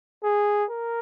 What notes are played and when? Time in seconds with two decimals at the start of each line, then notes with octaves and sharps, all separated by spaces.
0.24 G#4
0.70 A#4